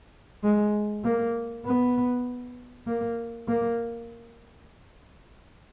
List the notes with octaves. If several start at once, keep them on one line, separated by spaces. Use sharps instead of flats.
G#3
A#3
B3
A#3
A#3